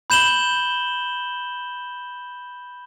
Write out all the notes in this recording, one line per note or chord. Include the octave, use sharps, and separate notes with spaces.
B5 G6 E7 F#7 G7